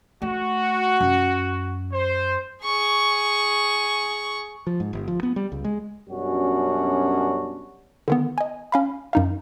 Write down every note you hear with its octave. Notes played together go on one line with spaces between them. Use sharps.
A3 F#4
F#2
C5
G#4 C#6
F3
G#2
G1
F3
B3
G3
C#2
G#3
F#2 B2 G3 C#4 D4 F#4
D3 D#3 B3
D#5 G#5
C#4 F5 B5
F#2 D#4 F5